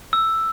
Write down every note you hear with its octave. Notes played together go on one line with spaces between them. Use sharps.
E6